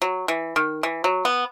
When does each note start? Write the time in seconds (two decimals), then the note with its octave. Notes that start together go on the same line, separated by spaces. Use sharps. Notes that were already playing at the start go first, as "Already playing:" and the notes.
0.02 F#3
0.28 E3
0.56 D#3
0.83 E3
1.04 F#3
1.25 B3